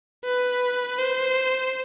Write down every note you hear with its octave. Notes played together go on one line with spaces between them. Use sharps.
B4
C5